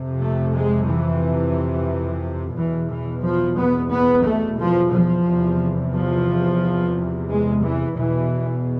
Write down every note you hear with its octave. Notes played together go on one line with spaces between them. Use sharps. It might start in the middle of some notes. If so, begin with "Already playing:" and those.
Already playing: F2 C3
A3
G#3
E3
E2 B2 E3
E3
F3
B3
B3
A3
F3
F3
E2 C3
F3
G#3
E3
E2 B2 E3